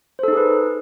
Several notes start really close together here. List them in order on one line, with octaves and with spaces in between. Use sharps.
C5 A4 D#4 G#4 B4